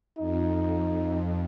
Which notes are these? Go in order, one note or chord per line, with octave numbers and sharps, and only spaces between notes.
F2 D#4